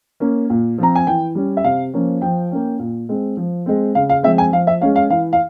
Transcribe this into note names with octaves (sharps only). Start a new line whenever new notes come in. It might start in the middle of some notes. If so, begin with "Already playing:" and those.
A#3 C#4
A#2
F3 C4 A#5
G#5
E3 G5
G3 C#4
E5
C3 F5
F3 A#3 C#4
F3 G5
A#3 C#4
A#2
G#3 C4
F3
G#3 C4
C#3 F5
F5
F3 G#3 C4 E5
G#5
F3 F5
E5
G#3 C#4 F5
F5
E3 F5
F5